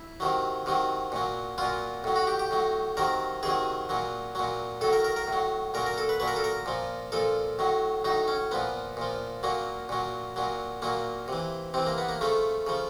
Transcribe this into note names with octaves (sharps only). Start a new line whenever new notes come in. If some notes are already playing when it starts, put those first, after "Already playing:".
Already playing: E4
C3 D#3 F#3
C3 D#3 F#3
A#2 F#3
A#2 F#3 F4
A2 F#3
F#4
G4
G4
A2 F#3
C3 D#3 F#3 A#4
C3 D#3 F#3 G#4
A#2 F#3
A#2 F#3
A2 F#3 A4
A#4
A#4
A#4
A2 F#3
A#2 F#3 A#4
A#4
A4
B4
A#2 F#3 B4
A#4
A4
A#4
A#2 F3
A#2 F3 A4
A2 F#3
A2 F#3 D#4
C#4
A#2 F3 B3
A#2 F3
A#2 F#3 A#3
A#2 F#3
A#2 F#3
A#2 F#3 A#3
C3 E3
C3 E3 C4
A#3
B3
A#3
C#3 F3 A3
C#3 F3